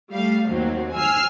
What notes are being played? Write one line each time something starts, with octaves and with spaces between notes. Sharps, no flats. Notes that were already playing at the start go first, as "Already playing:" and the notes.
G3 A3 F5
D#2 F#3 C4
G#5 E6 F6 C7